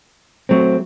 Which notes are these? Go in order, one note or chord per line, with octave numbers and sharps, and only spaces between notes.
F#3 A3 C4